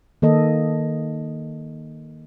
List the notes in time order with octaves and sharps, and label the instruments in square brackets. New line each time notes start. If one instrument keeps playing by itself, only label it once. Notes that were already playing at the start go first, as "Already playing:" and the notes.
[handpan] D#3 A#3 A4 D#5